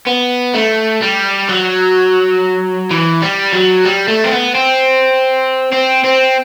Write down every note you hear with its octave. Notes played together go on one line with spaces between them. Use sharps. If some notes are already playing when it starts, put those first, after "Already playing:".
B3
A3
G3
F#3
E3
G3
F#3
G3
A3
C4
B3
C4
C4
C4